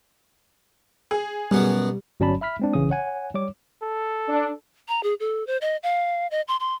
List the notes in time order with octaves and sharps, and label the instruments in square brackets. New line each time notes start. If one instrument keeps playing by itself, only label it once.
[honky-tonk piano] G#4
[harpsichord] F#2 B2 B3 [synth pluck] G3
[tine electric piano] G1 F#3 C#4 D5 A5 B5
E5 B5 F6 B6
G#3 C4 D4
A#1 C#3 E3 C#4 D#6
C#5 F#5 G#5
G3 C#5 D6
[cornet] A4
[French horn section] D4
[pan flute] A#5
G#4
A4
C5
D#5
F5
D#5
C6
C6